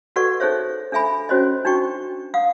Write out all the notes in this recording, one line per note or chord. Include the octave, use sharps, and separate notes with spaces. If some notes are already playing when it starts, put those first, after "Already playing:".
F#4 A4 B4 D5 F#5 C#6
D#4 G#4 A4 C5 C#5 E5
D4 A4 E5 G#5 B5
C#4 F#4 C5 C#5 D#5
D4 D#4 F#4 G5 C#6
F5 F#5 D#6